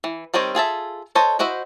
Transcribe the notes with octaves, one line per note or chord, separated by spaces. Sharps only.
E3
D#3 G3 C4 C#5 D#5
F4 G#4 A4 E5
A4 C5 C#5 D#5
E4 F#4 C5 D#5 E5